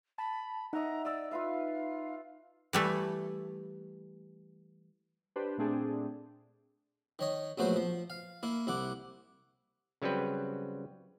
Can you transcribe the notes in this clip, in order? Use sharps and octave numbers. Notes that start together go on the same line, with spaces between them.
A5 B5
D#4 D#5 E5 F#5 A#5
D5 D#5 E6
F4 B4 E5 F5
E3 G3 A3
D4 G4 B4 C5
A#2 A3 C4 D4 G#4
D#3 C#5 D#5
A#1 F#3 A3 B3 F#4 C5
F3
F5
A#3 E4
C2 E4 F#5 D6
C#3 F#3 G3 C4 B4